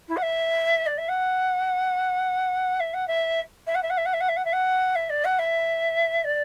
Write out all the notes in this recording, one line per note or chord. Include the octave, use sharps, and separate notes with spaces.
E4
F#5
E5
D5
E5
F#5
E5
F#5
E5
E5
F#5
E5
F#5
E5
F#5
E5
F#5
E5
F#5
E5
F#5
E5
D5
F#5
E5
D5